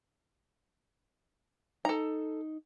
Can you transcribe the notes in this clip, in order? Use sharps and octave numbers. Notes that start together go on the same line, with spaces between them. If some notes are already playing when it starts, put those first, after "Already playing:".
D#4 A4 A#5